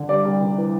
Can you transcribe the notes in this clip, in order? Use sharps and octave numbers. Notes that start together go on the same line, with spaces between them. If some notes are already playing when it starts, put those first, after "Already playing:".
Already playing: D3
G3 D5
C2
C3
E3